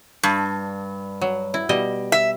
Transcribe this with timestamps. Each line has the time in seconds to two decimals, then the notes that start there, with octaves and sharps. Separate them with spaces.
0.23 G2
1.21 F#3
1.54 E4
1.69 B2 G3 D#5
2.12 E5